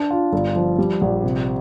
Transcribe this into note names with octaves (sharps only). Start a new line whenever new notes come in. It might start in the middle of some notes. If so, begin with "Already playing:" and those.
Already playing: D4
F4
G1
F3
G3
A#1
C3